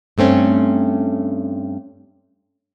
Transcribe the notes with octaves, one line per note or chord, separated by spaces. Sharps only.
G2 A3 C4 C#4